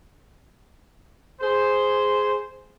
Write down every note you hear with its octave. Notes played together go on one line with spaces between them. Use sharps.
G#4 C5